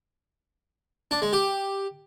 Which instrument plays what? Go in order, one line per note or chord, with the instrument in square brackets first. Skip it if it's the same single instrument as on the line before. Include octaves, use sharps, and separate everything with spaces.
[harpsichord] D4
G#3
G4